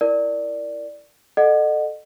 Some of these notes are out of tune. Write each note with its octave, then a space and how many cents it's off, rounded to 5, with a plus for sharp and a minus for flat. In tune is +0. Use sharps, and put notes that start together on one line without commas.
E4 +0 A#4 +0 D5 +0
A4 +0 D#5 -35 F#5 +0